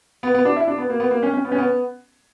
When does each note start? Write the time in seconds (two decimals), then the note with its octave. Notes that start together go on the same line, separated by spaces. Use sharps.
0.23 B3
0.35 B3
0.45 D4
0.56 E4
0.67 D4
0.78 B3
0.90 A#3
1.00 B3
1.11 A#3
1.23 C#4
1.34 C#4
1.45 B3
1.52 C#4
1.58 B3